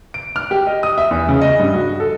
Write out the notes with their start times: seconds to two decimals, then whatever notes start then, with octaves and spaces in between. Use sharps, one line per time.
0.14 D7
0.36 F6
0.51 G4
0.67 D#5
0.83 D#6
0.98 E5
1.11 E2
1.29 C#3
1.41 D#5
1.59 G2
1.74 F#4
2.00 A4